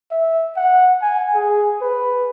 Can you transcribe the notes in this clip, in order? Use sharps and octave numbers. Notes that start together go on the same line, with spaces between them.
E5
F#5
G#5
G#4
B4